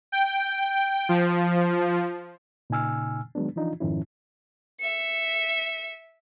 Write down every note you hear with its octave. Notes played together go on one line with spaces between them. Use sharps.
G5
F3
A#2 C#3 D#4 G#5 E6 F6
D#3 F#3 G#3 B3 D4
E3 F3 D4 D#4 F4
F2 G#2 D#3 F3 C#4 E4
E5 C#7